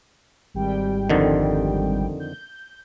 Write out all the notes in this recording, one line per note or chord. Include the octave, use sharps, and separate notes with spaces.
G#1 G3 G5
F2 D3 D#3
G6